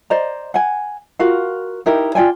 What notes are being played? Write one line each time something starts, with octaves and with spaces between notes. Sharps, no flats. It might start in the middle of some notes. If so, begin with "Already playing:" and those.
C5 D5 D#5 A#5
F#5 G#5
F4 F#4 A#4 F5
D#4 E4 G4 A#4
F4 D5 G5 G#5